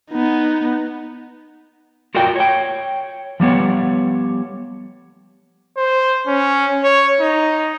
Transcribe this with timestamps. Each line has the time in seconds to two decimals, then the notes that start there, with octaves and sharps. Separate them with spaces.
0.11 B3 D#4
2.15 F4 F#4 A#4 D5 G5
2.36 C#5 G5
3.40 F3 G3 B3 C#5
5.77 C5
6.27 C#4
6.84 C#5
7.21 D#4